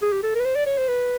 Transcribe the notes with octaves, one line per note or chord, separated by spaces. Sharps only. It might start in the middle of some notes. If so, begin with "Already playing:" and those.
G#4
G4
A4
A#4
B4
C5
D5
C#5
C5
B4